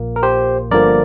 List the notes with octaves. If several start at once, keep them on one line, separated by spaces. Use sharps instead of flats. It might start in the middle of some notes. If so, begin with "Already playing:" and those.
Already playing: A#1 A#2 A#3
A#4
G4 C5
G1 G2 D3 F3 A#3 A#4 D5